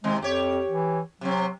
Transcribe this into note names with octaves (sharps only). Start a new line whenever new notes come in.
C3 D#3 G#3 C4
F2 G4 C#5
E3
C3 F#3 C4